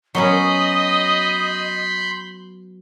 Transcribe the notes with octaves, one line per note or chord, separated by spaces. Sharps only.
F#3 B3 C#4 D#5 B5 C6 G6